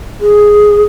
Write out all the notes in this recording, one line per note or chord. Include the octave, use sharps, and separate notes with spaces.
G#4